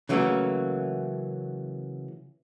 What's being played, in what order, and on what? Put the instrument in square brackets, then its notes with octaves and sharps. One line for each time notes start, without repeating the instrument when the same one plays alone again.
[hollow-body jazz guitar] C#3 E3 F#3 A3 A#3 C#4